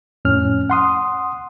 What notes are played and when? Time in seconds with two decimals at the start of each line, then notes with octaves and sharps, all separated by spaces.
0.25 F2 A2 C#4 F6
0.70 F#5 C6 D#6